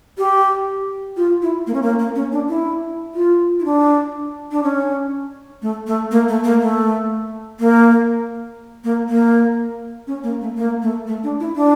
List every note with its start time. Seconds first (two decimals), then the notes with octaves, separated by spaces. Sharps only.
0.18 G4
1.17 F4
1.42 E4
1.67 A#3
1.74 C#4
1.82 A#3
1.99 A#3
2.15 C#4
2.32 D4
2.49 E4
3.15 F4
3.60 E4
3.65 D4
4.52 D4
4.63 C#4
5.62 A3
5.87 A3
6.11 A#3
6.28 A3
6.44 A#3
6.61 A3
7.60 A#3
8.84 A#3
9.09 A#3
10.07 C#4
10.23 A#3
10.41 A3
10.57 A#3
10.82 A3
11.07 A3
11.24 D4
11.40 E4
11.56 D4